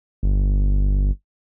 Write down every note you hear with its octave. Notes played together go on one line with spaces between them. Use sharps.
G1